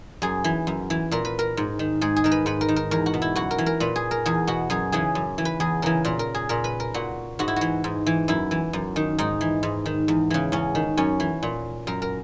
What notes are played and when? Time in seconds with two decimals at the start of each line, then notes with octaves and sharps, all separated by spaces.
0.22 F#2 G#4
0.44 E3
0.67 F#2
0.90 E3
1.11 A#2 A#4
1.25 B4
1.39 A#4
1.57 G#2
1.79 D#3
2.01 G#2 G#4
2.16 G#4
2.24 D#3 A#4
2.31 B4
2.46 G#2 B4
2.61 A#4
2.69 D#3
2.76 A#4
2.91 E2 A#4
3.06 F#4
3.14 B2
3.22 E4
3.35 F#2 F#4
3.51 A#4
3.58 E3
3.66 A#4
3.80 A#2 B4
3.96 G#4
4.11 A#4
4.26 E2 G#4
4.47 B2 F#4
4.70 F#2 G#4
4.92 C#3 E3 G#4
5.15 F#2
5.38 E3
5.45 B4
5.60 E2 G#4
5.82 C#3 E3 A#4
6.05 A#2 A#4
6.19 A#4
6.35 G#4
6.49 A#2 A#4
6.64 B4
6.80 A#4
6.94 A#2 F#4
7.39 G#2 F#4
7.48 E4
7.56 E3 F#4
7.84 G#2
8.06 E3
8.28 F#2 E4
8.51 E3
8.73 F#2
8.96 D#3
9.18 G#2 D#4
9.41 E3
9.63 G#2
9.86 D#3
10.08 E2
10.30 C#3 E3
10.52 E2 C#4
10.75 D#3
10.97 F#2 C#4
11.20 E3
11.43 A#2
11.87 F#2 A#4
12.02 A#4